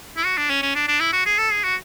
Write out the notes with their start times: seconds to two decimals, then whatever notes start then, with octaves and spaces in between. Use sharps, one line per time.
0.17 E4
0.25 F#4
0.37 D4
0.50 C#4
0.62 C#4
0.75 D4
0.88 D4
1.00 E4
1.13 F#4
1.26 G#4
1.38 A4
1.51 G#4
1.64 F#4